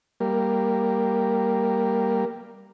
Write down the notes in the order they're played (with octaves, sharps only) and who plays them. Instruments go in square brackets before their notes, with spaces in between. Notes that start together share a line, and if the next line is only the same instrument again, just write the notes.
[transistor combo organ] G3 A#3